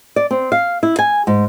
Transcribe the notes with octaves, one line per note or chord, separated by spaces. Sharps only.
D5
C4
F5
E4
G#5
G#2